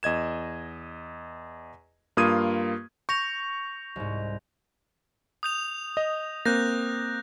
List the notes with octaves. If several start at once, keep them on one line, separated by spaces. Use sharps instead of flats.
E2 D#5 G#6 E7
G2 A#3 F4 D#6 G#6 D#7
C#6 G6 A#6 F7
C2 G#2
D#6 G6 F7
D#5
A#3 C4 F#6 G6 A#6